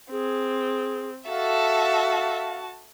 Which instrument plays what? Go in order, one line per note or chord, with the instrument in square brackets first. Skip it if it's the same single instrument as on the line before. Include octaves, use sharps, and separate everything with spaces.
[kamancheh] C4 [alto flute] G#4
[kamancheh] F#4 A5 [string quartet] A4 E5 [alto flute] F5